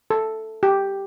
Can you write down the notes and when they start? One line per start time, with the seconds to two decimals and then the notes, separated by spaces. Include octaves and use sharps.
0.10 A4
0.63 G4